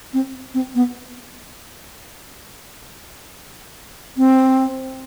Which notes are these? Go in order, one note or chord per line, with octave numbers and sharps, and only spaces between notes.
C4
C4
B3
C4